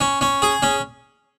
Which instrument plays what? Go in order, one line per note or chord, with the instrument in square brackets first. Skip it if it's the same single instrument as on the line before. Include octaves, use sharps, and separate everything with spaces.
[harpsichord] C#4
C#4
G#4
C#4